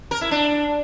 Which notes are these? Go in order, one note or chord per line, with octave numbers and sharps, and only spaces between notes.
A#4
E4
D4